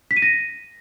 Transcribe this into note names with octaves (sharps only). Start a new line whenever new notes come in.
B6
D#7
A#6